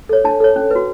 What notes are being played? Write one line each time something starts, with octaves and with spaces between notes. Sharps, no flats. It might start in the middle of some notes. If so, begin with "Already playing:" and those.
A4 C#5
D4 A5
A4 C#5
C#4
F#4 B4